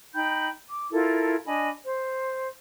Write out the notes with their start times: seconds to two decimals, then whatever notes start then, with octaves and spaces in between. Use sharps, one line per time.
0.15 D#4 G5 B5 G6
0.69 D6
0.91 E4 F4 A4 A#4
1.46 D4 D#5 G#5 B5
1.84 C5